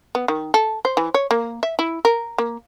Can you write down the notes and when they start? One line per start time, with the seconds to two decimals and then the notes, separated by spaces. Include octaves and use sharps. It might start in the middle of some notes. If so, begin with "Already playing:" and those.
0.15 B3
0.28 D#3
0.54 A4
0.85 C5
0.97 E3
1.14 C#5
1.31 A#3
1.63 E5
1.79 E4
2.05 A#4
2.38 A#3